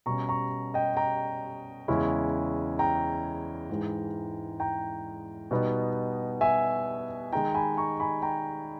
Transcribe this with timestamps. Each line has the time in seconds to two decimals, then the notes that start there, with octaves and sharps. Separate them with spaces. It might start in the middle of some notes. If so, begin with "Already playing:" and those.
0.06 B2 G3 C#4 A#5 C#6
0.29 A#5 C#6
0.74 D#5 G5
0.97 G5 A#5
1.88 E2 C#3 G#3 C#4 E4
2.79 G5 A#5
3.70 G#2 E3 G#3
4.60 G5 A#5
5.51 B2 G3 B3 D#4
6.41 E5 G#5
7.33 D#3 G#3 D#4 G5 A#5
7.54 G#5 B5
7.77 A#5 C#6
8.00 G#5 B5
8.22 G5 A#5